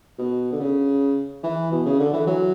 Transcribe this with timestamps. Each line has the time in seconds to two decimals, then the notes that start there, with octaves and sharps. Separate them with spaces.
0.18 B2
0.52 D3
0.60 C#3
1.44 E3
1.72 B2
1.86 C#3
1.99 D3
2.13 E3
2.27 F#3